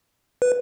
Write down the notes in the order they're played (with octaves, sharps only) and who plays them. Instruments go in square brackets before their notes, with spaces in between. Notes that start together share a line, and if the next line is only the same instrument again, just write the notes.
[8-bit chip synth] B4